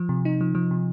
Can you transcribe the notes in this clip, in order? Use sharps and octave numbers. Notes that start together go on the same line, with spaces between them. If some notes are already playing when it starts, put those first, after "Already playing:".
Already playing: F3
C3
D#4
F3
F3
C3